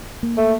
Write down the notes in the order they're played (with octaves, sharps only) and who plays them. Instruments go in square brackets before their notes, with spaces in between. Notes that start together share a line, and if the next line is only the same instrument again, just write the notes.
[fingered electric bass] A#3
[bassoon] A3